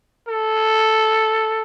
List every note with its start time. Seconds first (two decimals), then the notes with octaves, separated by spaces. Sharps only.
0.28 A4